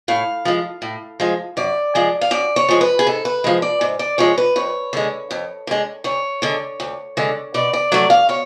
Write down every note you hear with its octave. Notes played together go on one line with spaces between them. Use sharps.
A2 F5
F3 G#3
A2
F3 G#3
F#2 D5
F3 G#3
F5
F#2 D5
C#5
F3 G#3
B4
G#4
G#2 A4
B4
F3 G#3
D5
G#2
D5
F3 G#3 C#5
B4
F2 C#5
D3 G#3
F2
D3 G#3
D2 C#5
D3 G#3
D2
D3 G#3
B2 D5
D5
F#3 A3 D5
F5
B2 C#5